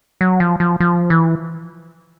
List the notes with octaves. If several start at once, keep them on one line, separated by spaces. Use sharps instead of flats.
F#3
F3
F3
F3
E3